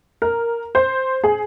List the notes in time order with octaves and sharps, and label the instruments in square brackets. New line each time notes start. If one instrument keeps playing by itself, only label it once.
[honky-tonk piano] A#4
C5
G#4